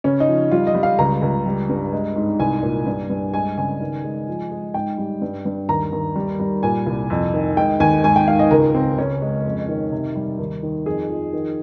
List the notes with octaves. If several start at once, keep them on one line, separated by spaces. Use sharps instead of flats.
C#3 C#4
D#4
F3
G3 F4
D#5
G3
F5
C#2 A#5
C#2
G3
G2
G#3
G#2
C2 G#5
A#2
G2
G2
G#3 G#5
C#3 G#5
D#3
G#3
F3
G#3
G#2 G5
G3
G2
G2
D#2 A#5
D#2
G3
G3
A#2 G#5
C2
F2
D#3
G#3 G5
D#2 G#5
G#2 G#5
G5
G#2 F5
D#5
C#2 A#4
C#2 C4
C#3 C#4
G#3
F2
D#3
C3
G3
D#2
D#3
F2 G#4
F3
D#3